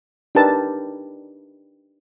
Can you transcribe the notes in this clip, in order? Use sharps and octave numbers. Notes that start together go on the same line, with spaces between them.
D4 D#4 G4 A#4 B4 A5